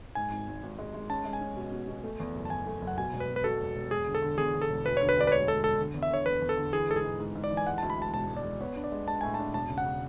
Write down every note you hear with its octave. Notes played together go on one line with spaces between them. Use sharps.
G#2 G#5
G#1
G#1
G#1
G#3
G#3
C#4 A5
G#3
G#5
C#4
B2
B2
B2
A3
E2
F#1
A5
E2 G#5
A3
F#1
F#5
B2 G#5
E1
B4
E1
B4
B2 A4
E1
E1
E1 G#4
D3
A4
D3
E2 G#4
D3
A4
E1
D2 B4
D3 C#5
B4
D2 D5
B4
G#3 C#5
G#3 A4
E1 A4
D3
E2
E5
D3 C#5
E2 B4
E2
A4
D3
E3 G#4
G#2 A4
G#4
G#2
G#2
G#2
D5
E3
G#5
G#3 F#5
D2 A5
B5
G#3 A5
E1 A5
E1
D5
E1
B3 C#5
D4
D5
G#3
G#3 A5
A2 G#5
D4 A5
E1 A5
C#3
F#5
C#3